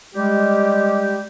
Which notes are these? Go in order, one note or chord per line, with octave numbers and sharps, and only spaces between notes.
G3 G#3 G4